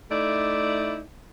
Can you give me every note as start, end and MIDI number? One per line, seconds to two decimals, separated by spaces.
0.10 1.01 57
0.10 1.01 63
0.10 1.01 64
0.10 1.01 74